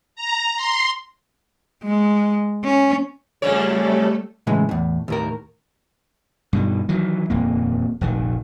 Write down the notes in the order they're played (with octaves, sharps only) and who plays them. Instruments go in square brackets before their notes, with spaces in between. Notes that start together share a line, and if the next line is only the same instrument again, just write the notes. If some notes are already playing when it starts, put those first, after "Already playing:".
[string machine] A#5
C6
[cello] G#3
C#4
[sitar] F2 C#3 C#5 [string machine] G3 A3 A4
[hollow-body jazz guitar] A2 C#3 E3 G#3
E2 A2
D#2 A2 A#4
[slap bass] G2 B2 D#3
D#3 E3 F#3
D#1 F2 A#3
F1 A#1 D#3